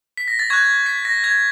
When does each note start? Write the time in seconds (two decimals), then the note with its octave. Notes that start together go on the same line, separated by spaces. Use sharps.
0.17 B6
0.28 A#6
0.39 A6
0.50 C#6 F#6 G#6
0.86 B6
1.05 A#6
1.24 G#6